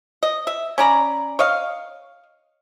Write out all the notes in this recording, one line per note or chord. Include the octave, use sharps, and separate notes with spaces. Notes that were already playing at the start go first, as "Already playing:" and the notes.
D#5
E5
C#4 D5 A#5 B5
C#5 D#5 F5